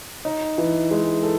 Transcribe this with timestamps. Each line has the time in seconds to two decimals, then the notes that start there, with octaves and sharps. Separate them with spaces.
0.25 D#4
0.58 E3
0.91 G#3
1.23 A4